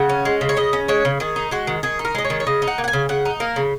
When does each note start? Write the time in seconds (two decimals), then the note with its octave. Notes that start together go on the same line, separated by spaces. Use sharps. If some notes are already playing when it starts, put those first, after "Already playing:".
Already playing: C#3 F#5
0.09 C#4
0.25 G#3
0.41 C#3
0.49 C#5
0.57 C#3 D#5
0.73 C#4
0.88 G#3 C#5
1.05 C#3
1.20 D#3 G#4
1.36 D#4
1.51 G#3 F#4
1.67 D#3
1.83 D#3 G#4
1.99 D#4
2.05 A#4
2.15 G#3 D#5
2.25 C#5
2.30 D#3
2.40 C#5
2.47 C#3 D#5
2.62 D#4
2.68 F#5
2.78 A#3
2.84 F#5
2.88 G#5
2.93 C#3
3.09 C#3 F#5
3.25 D#4
3.40 A#3 A#4
3.56 C#3